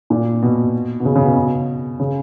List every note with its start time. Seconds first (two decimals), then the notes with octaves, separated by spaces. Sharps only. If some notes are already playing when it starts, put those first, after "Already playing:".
0.10 A#2
0.42 B2
1.00 B2
1.05 C#3
1.15 C#3
1.25 B2
2.00 C#3